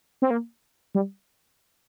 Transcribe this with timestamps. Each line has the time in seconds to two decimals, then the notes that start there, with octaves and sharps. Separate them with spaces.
0.22 C4
0.30 A#3
0.95 G3